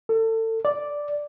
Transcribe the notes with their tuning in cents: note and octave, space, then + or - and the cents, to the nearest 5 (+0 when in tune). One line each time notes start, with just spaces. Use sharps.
A4 +30
D5 -5